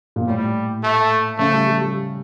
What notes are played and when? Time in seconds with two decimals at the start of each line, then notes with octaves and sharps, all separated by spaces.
0.16 A#2
0.27 A2 G3
0.83 A3
1.38 C#3 A3
1.53 G3
1.67 G3
1.80 G3